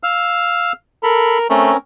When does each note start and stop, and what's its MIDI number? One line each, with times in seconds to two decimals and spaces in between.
0.03 0.72 77
0.03 0.72 88
0.03 0.72 89
1.03 1.38 69
1.03 1.45 70
1.03 1.38 83
1.50 1.72 57
1.50 1.77 60
1.50 1.77 61
1.50 1.77 70